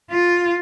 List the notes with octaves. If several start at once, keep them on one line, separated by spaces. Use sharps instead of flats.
F4